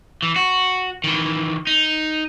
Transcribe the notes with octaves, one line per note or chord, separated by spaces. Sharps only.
E3
F#4
D#3 E3
D#4